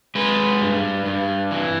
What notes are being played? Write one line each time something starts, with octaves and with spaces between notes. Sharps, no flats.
G#3 B4
G2
G2
E3